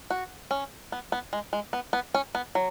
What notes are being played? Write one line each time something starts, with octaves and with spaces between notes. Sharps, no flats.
F#4
C#4
B3
B3
G#3
G#3
B3
B3
C#4
B3
F#3